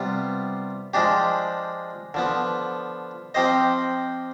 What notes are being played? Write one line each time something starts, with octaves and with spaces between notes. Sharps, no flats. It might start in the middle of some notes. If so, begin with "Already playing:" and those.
Already playing: C3 G3 B3 F4
F3 G#3 D4 G4
D3 F3 B3
F3 C4 G4 C5 D#5